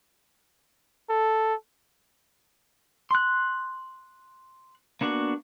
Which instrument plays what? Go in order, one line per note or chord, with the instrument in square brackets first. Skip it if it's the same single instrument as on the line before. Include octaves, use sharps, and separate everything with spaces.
[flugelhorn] A4
[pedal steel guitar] C6 F#6
A#3 B3 D4 F#4